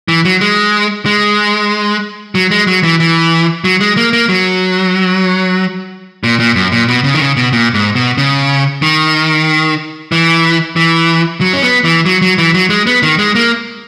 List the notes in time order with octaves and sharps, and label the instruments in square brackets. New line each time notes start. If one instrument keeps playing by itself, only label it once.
[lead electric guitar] E3
F#3
G#3
G#3
F#3
G#3
F#3
E3
E3
F#3
G#3
A#3
A#3
F#3
A#2
A#2
F#2
A#2
B2
C#3
D#3
C#3
B2
A#2
G#2
B2
C#3
D#3
E3
E3
F#3
C#4
B3
E3
F#3
F#3
E3
F#3
G#3
B3
D#3
G#3
A#3